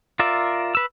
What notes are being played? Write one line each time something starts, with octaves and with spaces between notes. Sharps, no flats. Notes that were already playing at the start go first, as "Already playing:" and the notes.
F4 A#4 D5 E5
B4 E6